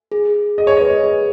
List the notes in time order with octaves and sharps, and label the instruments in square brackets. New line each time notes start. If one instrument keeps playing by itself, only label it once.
[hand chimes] G#4
G#4
[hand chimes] G#4 [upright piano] D#5
[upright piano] C#5
[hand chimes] B4 [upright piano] D#5
[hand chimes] G#4